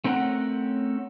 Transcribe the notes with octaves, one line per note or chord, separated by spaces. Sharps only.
A3 C4 C#4 A#4 F5 F#5